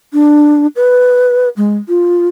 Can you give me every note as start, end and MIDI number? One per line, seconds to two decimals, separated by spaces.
0.13 0.67 62
0.76 1.49 71
1.57 1.78 56
1.88 2.28 65